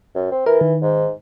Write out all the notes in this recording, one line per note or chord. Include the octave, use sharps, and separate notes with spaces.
F#2
C4
E3 A#4
D#3
G#2